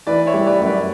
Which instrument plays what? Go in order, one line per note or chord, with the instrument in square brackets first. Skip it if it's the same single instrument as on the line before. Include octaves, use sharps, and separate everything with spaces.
[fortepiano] E3 [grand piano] B4 D5
[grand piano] C#5 E5
[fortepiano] G3
[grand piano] B4 D5
[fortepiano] F#2
[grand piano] B4 D5